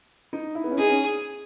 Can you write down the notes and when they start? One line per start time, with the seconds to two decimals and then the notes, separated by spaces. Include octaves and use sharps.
0.33 D#4
0.55 E4
0.64 B3
0.71 C#4
0.78 D#4 G#4
0.89 C#4